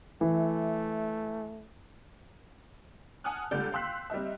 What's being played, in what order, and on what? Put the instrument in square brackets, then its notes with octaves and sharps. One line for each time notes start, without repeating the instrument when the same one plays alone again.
[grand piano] E3 [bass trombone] A3
[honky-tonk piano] F#5 G#5 A5 D#6 F6 F#6
C#2 D3 G3 D5 G6
F5 G5 C6 E6 F#6 B6
G3 C4 D#4 E5